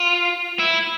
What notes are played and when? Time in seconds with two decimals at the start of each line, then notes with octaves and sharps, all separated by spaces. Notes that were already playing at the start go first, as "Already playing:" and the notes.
Already playing: F4
0.59 E4